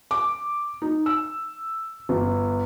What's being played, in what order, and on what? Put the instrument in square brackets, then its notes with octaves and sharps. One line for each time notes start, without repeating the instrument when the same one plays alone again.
[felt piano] D6
D#4
E6
G1